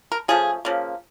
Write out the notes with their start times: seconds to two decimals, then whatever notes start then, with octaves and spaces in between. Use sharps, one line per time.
0.12 A#4
0.28 C#3 F3 A3 G#4
0.65 C#3 F3 A#3